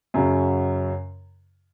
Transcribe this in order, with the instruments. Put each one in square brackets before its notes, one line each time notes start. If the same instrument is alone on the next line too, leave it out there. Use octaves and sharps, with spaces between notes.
[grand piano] F#2 C#3 F#3 C#4